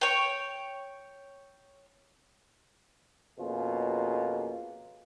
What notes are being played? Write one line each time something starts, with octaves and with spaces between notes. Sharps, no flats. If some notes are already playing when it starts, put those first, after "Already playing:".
C#5 G5
F2 B2 A#3 C#4 F4 G#4